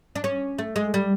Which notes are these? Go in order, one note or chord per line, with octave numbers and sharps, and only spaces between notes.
D4
C#4
A3
G#3
G3